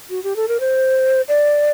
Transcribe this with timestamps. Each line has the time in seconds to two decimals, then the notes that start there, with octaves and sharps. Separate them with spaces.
0.10 F#4
0.23 G4
0.36 A4
0.48 A#4
0.60 C5
1.28 D5